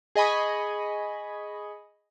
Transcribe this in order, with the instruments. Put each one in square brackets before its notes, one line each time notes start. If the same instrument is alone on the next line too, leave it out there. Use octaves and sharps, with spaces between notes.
[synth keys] G#4 D#5 G#5 B5 C#6